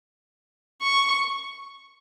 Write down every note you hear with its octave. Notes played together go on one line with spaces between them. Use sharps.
C#6